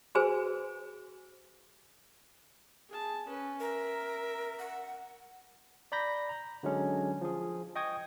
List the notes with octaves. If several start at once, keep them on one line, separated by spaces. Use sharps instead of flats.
F#4 G#4 B4 C5 G#5
G#4 A5
C#4 B4
A#4 E5
F#5
D5 A#5 B5 G6 A#6
A#5
D3 F#3 G#3 C#4
F3 G#4
D#5 G5 C#6 D#6 G#6